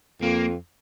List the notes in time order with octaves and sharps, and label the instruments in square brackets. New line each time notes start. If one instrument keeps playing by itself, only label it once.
[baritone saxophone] F2 [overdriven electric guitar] A#3